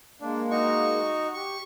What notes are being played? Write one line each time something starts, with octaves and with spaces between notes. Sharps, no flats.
G#3 A#3 D4
D#4 F#4 C#6
G4 C#6